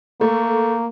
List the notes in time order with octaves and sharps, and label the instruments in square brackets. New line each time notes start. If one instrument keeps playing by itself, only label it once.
[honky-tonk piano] A3 [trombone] A#3